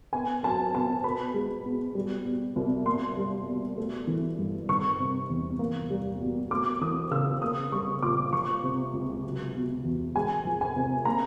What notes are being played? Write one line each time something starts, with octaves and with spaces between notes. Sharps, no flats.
B3 G#5
F#3 A5
B2 A5
B3 B5
G#3
B2
G3
B2
C2
A#3 C6
G3
B2
A3
E3
G2
D#3 C#6
C3
E2
A#3
G3
B2
A3 D6
E3 D#6
C#3 E6
A#3 D#6
G3 C#6
A#2 D6
F3 C#6
C3
C#2
F#3
B2
E2
G#3 G#5
F3
G#5
C3
A#3 A#5